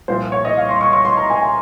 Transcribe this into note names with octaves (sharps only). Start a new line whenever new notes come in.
C2 A#2 F3 C5
C#5
D#5
F5
C6
C#6
C#6
C6
A#5
G#5
G#5